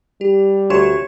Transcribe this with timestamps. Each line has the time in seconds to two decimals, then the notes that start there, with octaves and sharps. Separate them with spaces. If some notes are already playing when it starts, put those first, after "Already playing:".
0.21 G3 G4
0.70 D2 G4 C#5 C6 E7